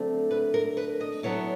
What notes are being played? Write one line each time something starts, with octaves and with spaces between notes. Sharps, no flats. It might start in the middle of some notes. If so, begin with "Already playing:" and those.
Already playing: D3 F#3 A3 C4
B4
A#4
B4
D#5
D3 F#3 B3 E4 C#5